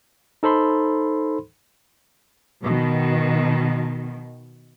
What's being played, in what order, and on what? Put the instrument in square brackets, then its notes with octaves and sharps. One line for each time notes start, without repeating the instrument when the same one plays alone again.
[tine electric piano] D#4 A4 C5 B5 C6
[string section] B2 D#3